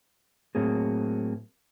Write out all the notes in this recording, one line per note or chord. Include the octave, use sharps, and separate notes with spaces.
A2 F#3 A#3 C4 G#4